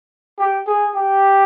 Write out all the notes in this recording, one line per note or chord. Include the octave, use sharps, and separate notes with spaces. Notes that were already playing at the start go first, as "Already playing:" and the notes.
G4
G#4
G4